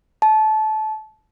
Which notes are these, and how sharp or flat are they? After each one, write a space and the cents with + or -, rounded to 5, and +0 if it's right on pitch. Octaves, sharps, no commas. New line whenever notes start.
A5 -25